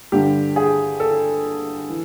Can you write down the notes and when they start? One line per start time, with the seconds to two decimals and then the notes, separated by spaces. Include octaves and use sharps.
0.12 G2 D3 G3 G4
0.56 G#4
1.00 A4
1.90 E3